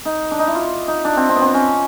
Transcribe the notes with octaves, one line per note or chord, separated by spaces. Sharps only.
D#4
D4
D#4
E4
F4
D#4
D4
C4
C4
B3
C4
C#4